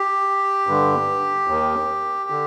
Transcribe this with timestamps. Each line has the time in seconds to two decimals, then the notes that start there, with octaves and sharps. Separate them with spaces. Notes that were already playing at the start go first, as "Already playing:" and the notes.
Already playing: G4
0.67 G2 D3
1.47 D#2 D#3
2.30 D3